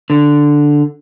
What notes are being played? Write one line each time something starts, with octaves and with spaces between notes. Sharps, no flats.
D3